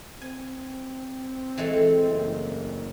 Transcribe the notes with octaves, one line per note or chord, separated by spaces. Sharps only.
C4 G#5
E3 G#3 A3
F#1